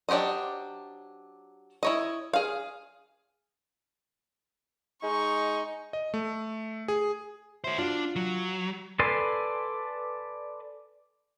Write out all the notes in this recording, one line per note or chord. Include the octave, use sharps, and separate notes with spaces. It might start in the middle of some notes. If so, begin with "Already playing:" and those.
F#3 D4 G4 C5 D#5
E4 C#5 D#5
G#4 F5
G#3 D#4 C#6
D#5
A3
G#4
F#4 C5 C#5 E5
D4 F4 F#4
F#3
A4 B4 D5 G#5 C6